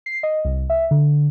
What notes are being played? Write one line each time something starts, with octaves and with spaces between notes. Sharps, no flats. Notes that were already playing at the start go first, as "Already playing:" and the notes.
C7
D#5
C2
E5
D3